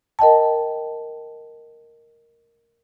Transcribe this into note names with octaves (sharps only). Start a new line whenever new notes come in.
A#4 D#5 G5 A5